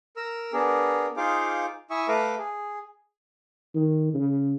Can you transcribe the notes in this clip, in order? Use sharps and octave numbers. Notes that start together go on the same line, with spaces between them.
A#4 A#5 E6
B3 D4 G#4 A#4
D#4 F4 G#4 C5 F5 D6
E4 E5 G#5 C#6 D#6
A3 A4 B4 F5 A#5 D6
G#4
D#3
C#3